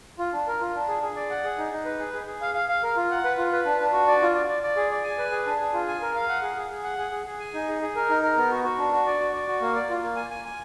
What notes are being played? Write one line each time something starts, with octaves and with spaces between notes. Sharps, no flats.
F4
D4
A#4
F4
D4
G#4
G#4
D5
F#5
G#4
D#4
D#4
B4
G#4
G#4
G#4
F5
F5
F5
A#4
F4
F#5
B4
F4
B4
D4
D4
F#4
D5
F4
D5
D5
D5
G#4
D5
G#5
B4
G#4
D4
G#4
F4
G#5
A#4
F5
F#5
G#4
G#4
G#4
F#5
G#4
G#4
G#4
G#5
D#4
G#4
G#4
A#4
D#4
A#4
B3
F#4
F#4
D4
F#4
D5
F#4
D5
F#4
A#3
D5
F4
A#3
G#5
G#5
G#5